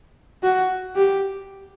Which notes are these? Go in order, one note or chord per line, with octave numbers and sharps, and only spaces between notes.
F#4
G4